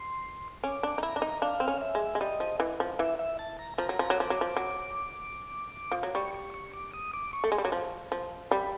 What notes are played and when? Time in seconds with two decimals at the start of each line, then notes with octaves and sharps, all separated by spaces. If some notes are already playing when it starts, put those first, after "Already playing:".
Already playing: C6
0.63 C#4 D6
0.83 D4
0.98 D#4
1.03 E4 A#5
1.16 D4
1.22 D#4
1.42 D4 F5
1.60 C4
1.68 C#4
1.81 E5
1.95 G#3
2.15 G#3
2.21 G3 D#5
2.40 F3
2.60 E3
2.80 F3
2.99 E3 E5
3.19 E5
3.39 A5
3.59 A#5
3.78 F3 A#5
3.89 F#3
3.99 F3
4.10 F#3
4.18 F3 D6
4.30 F#3
4.41 F3
4.56 F#3
5.92 F3
6.03 F#3
6.15 G3 C#6
6.34 C#6
6.54 C#6
6.74 D6
6.94 D#6
7.14 D6
7.33 C#6
7.44 A3
7.52 G#3
7.58 G3
7.65 F#3
7.72 F3
8.12 F3
8.51 G3 B5